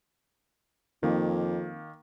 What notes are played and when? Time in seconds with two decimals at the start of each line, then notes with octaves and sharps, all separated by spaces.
1.03 F2 D#3 A#3